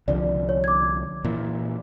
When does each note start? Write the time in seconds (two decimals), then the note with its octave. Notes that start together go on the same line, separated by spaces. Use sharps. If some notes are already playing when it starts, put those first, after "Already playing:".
0.08 C2 D3 F3 D5
0.49 C#5
0.64 D6 G#6
1.24 A#2 E3